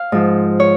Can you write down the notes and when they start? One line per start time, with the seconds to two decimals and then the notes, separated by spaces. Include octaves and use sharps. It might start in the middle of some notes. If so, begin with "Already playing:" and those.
Already playing: F5
0.12 G#2 F3
0.60 C#5